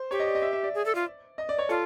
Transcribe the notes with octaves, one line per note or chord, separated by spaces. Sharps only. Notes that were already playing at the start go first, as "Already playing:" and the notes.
Already playing: C5
G4 C#5
D#5
D5
D#5
E5
E5
D5
G#4
A4
F4
D#5
D5
C#5
F4 A4